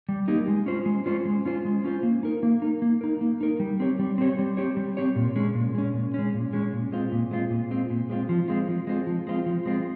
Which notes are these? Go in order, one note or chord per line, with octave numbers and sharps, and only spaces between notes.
G3
A#3 D#4 G4
G#3
C#4 F4 C5
G#3
C#4 F4 C5
G#3
C#4 F4 C5
G#3
C#4 F4 C5
A#3
D#4 A#4
A#3
D#4 A#4
A#3
D#4 A#4
A#3
D#4 A#4
G3
C4 G4 C#5
G3
C4 G4 C#5
G3
C4 G4 C#5
G3
C4 G4 C#5
A#2
G#3 C#4
A#2
G#3 C#4
A#2
G#3 C#4
A#2
G#3 C#4
A#2
G#3 C4 F4
A#2
G#3 C4 F4
A#2
G#3 C4 F4
A#2
G#3 C4 F4
F3
G#3 C4 F4
F3
G#3 C4 F4
F3
G#3 C4 F4
F3
G#3 C4 F4